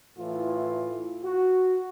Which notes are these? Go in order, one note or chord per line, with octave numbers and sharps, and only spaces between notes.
A2 E3 F4
F#4